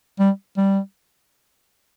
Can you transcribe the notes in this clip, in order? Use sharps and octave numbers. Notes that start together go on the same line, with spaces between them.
G3
G3